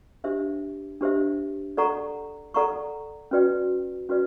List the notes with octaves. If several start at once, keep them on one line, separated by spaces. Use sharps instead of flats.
D4 G4 C5 E5
D4 G4 C5 E5
A4 D5 F#5 A#5 C#6
A4 D5 F#5 A#5 C#6
C#4 F#4 B4 D5 G5
C#4 F#4 B4 D5